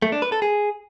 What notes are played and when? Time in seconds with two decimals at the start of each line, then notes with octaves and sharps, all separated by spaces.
0.02 A3
0.12 D4
0.22 B4
0.32 A4
0.42 G#4